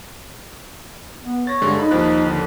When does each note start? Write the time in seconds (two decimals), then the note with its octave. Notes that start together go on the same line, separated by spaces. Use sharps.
1.24 B3
1.47 C#5 A6 A#6
1.61 G2 D3 G#3
1.79 D#4 B5
1.91 D#2 F3 F#6
2.26 D3